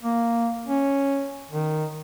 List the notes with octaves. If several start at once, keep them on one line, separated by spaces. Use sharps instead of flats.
A#3
C#4
D#3